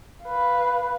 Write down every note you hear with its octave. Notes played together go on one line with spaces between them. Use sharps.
B4 F5